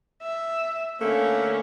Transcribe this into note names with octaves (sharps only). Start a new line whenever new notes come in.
E5
D3 A3 A#3 C#4